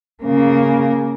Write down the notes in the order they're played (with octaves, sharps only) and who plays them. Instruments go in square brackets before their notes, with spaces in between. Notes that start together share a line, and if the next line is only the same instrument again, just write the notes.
[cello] C#3 A#3